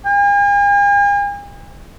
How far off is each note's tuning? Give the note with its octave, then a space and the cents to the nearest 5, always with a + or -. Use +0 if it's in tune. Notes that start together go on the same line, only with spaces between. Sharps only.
G#5 -45